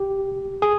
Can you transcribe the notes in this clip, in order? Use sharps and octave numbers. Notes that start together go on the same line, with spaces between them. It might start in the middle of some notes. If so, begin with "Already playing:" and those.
Already playing: G4
G#4